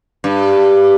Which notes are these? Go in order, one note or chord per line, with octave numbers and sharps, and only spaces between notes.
G2